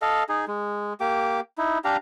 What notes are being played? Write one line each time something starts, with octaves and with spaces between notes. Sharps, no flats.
A4 D#5 F5
D#4 G#4
G#3
A#3 G4 D6
D#4 E4
D4 G4 F5 A#5